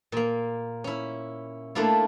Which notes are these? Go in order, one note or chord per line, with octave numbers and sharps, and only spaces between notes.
A#2 A#3
C#4 E4
A3 A#3 D4 E4 F4